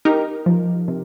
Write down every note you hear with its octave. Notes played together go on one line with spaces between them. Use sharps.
D#4 G4 A#4
F3
C3